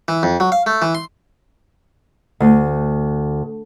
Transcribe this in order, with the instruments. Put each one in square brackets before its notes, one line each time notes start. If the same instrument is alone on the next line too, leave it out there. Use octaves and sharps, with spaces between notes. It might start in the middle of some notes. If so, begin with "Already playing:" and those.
[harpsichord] E3
F2
F#3
F5
A3
E3
C6
[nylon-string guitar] D2